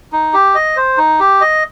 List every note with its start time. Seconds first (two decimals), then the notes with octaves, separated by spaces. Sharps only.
0.13 D#4
0.34 G4
0.55 D#5
0.76 C5
0.98 D#4
1.20 G4
1.41 D#5